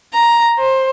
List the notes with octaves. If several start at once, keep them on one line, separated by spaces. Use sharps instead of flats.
A#5
C5